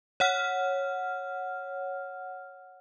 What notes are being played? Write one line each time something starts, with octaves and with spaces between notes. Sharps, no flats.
C#5 F#5 F6